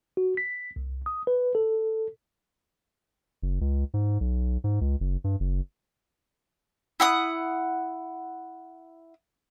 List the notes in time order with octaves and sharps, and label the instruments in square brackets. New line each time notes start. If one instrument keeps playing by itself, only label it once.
[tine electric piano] F#4
B6
C2
D#6
B4
A4
[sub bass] F#1
C#2
G#2
B1
G#2
C#2
F#1
G2
F#1
[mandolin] E4 F#5 D#6